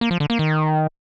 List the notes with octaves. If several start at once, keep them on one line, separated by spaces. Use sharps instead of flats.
A#3
F3
D3
A#3
D#3